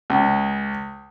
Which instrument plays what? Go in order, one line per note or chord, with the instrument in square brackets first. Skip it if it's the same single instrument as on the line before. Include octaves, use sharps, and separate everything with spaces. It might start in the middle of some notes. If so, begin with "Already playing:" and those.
[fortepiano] C#2